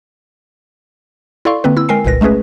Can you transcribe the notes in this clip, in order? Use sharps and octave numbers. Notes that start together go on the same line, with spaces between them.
E4 A4 D5 F5 C6 C#6
D3 A#3 C4 B4
E4 E6
G#3 A#4 G5 G#5 C7
G1 C2 A#2 B4 A#6
G#3 A3 C#4 G#4 B4